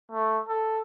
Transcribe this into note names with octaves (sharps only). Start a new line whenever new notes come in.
A3
A4